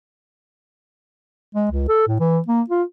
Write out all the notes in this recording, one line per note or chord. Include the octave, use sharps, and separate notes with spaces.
G#3
C#2
A4
A2
E3
A#3
F4